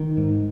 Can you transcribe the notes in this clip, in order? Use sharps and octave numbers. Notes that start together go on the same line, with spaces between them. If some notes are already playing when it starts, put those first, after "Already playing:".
Already playing: D#3
G#2